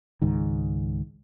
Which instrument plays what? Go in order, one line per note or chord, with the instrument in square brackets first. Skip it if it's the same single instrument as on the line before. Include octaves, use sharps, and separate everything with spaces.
[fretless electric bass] C#2 G#2 D#3